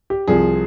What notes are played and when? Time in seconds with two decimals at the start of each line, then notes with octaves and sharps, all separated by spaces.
0.10 G4
0.28 C2 C3 F3 G#4